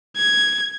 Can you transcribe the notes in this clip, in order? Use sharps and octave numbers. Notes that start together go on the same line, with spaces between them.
G#6